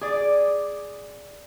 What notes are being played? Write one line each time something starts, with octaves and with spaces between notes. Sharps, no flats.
G#4 D5